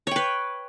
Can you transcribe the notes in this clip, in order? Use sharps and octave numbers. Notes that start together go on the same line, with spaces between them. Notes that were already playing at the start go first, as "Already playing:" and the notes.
B4 C#5 G5